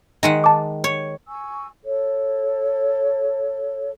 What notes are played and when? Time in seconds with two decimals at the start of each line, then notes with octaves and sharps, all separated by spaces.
0.23 D#3 G#3 F#5
0.44 A5 D6
0.84 C#5
1.28 G#5 C#6 E6
1.85 A4 C#5